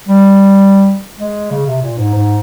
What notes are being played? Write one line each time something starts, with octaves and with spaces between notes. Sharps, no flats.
G3
G#3
C#3
C3
A#2
G#2
G#2